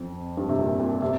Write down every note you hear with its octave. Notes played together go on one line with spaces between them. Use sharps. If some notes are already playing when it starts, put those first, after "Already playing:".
Already playing: F2
G2
C3
A#2
A#2
C3